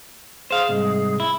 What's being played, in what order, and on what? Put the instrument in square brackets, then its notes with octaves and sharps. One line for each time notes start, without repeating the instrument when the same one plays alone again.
[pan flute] G#4 [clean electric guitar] C5 F5
[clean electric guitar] C2 G#2
E4